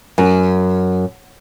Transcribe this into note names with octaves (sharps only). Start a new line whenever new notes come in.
F#2